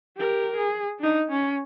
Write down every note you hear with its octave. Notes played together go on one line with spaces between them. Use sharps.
G4 A#4
G#4
D4 D#4
C#4